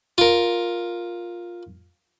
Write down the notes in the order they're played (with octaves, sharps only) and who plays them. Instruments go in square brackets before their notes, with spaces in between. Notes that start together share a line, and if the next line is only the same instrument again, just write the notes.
[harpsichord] F4 A#4